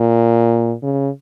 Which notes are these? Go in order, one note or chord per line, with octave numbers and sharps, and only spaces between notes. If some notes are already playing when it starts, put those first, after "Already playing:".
Already playing: A#2
C#3